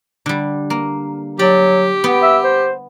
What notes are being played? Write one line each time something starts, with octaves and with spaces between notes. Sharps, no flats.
D3 G3
A#3
F#3 G4 D5
B3 G5
E5
C5